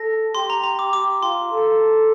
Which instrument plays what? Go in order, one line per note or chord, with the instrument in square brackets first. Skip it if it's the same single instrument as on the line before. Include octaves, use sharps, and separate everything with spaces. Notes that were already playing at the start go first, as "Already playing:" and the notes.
Already playing: [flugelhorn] A4 [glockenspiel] A#6
[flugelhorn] G4 [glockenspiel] C6
[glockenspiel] A#5
A#5
D6
[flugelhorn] G4 [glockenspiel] D6
[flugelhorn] F4 [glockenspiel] C6
[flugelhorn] A4